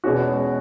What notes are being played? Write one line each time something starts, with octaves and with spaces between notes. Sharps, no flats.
E2 B2 G#3 C#4 F#4